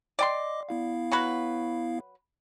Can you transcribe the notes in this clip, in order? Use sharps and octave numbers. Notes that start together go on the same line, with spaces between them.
D5 D#5 G5 C6 D6
B3 E4 F5
F#3 F#4 B4